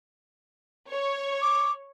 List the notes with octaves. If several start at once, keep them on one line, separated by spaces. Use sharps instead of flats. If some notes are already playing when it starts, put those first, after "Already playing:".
C#5
D6